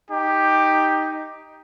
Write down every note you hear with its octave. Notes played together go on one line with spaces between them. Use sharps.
D#4 G4